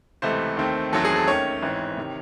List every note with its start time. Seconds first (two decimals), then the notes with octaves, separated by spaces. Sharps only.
0.22 C#2 C3 E3 A3 C5
0.57 D#2 D#3 A3 C4
0.93 E2 D#3 F#3 A3 C4 A4
1.05 G#4
1.16 A4
1.28 D#2 D#3 A3 C#4 C#5
1.62 A1 G#2 E3 C4
1.97 C3 D#3